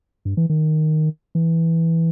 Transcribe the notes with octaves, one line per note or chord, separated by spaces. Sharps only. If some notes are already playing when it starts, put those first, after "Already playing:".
G2
E3
D#3
E3